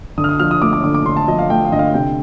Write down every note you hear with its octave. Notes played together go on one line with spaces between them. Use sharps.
D3 D#6
F6
D#6
F3 F6
D#6
A3 D6
D6
D3 D6
D6
D3 C6
A5
F3 D#5
F5
A3 G5
F5
D3 D#5
F5
C3 G5